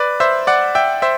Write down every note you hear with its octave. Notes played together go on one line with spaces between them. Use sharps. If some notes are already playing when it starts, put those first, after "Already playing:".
Already playing: B4 D5
C5 E5
D5 F#5
E5 G5
C5 E5